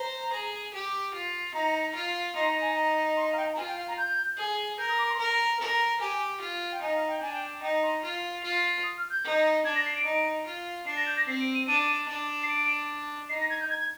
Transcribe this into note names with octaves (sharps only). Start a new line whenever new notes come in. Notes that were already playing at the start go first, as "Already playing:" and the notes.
Already playing: C5 A#5
G#4
G4
F4
D#4 A#5
F4
D#4 C6
A#5
G#5
A#5
C6
A#5
F5
G5
A#5
F4 G#5
G5
F5
A#5
G6
G#4
A#4 G6
D#6
D6
C6
A#4 A#5
A#4
G4 G#5
F4
G5
D#4 G#5
F5
G5
D4 G#5
G5
D#4 G5
C6
F4
F4
D#6
F6
G6
D#4
D4 G#6
A#6
C7
D7
D#4
F4
D4 C7
A#6
G6
A#6
C4 C7
D7
D#7
D4 D#7
D4
C7
D7
D#4 C7
A#6
G#6
G6
G#6
G#6